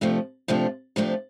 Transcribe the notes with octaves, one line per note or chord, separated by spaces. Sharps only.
C3 F3 A3 D4 F4
C3 F3 A3 D4 F4
C3 F3 A3 D4 F4